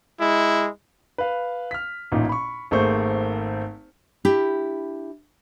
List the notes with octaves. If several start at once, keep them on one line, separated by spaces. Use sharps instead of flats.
G#3 E4
B4 F5
F6 B6
A1 A#2 D#4
B5 C#6
G#1 A3 A#3 G#4 C5 C#6
D4 E4 G4